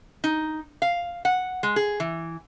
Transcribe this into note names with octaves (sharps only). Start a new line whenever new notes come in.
D#4
F5
F#5
G#3
G#4
E3